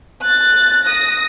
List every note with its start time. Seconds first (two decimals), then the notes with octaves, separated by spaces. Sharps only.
0.21 F#6 A6
0.85 D#6 A#6